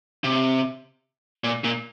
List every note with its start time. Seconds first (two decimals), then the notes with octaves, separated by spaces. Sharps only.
0.24 C3
1.44 A#2
1.64 A#2